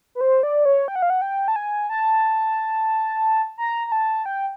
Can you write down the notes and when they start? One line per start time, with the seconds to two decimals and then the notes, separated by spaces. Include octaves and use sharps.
0.15 B4
0.21 C5
0.43 D5
0.65 C#5
0.88 G5
0.96 F#5
1.02 F5
1.10 F#5
1.22 G5
1.48 A5
1.56 G#5
1.90 A5
3.58 A#5
3.87 A#5
3.92 A5
4.26 G5